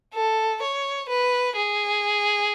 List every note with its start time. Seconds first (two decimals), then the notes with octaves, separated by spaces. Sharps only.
0.14 A4
0.62 C#5
1.09 B4
1.56 G#4